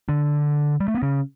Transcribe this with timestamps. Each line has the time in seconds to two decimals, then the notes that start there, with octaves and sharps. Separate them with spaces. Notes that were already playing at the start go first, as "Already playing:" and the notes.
0.09 D3 D4
0.80 G3
0.88 A3
0.95 B3
1.03 C#3 C#4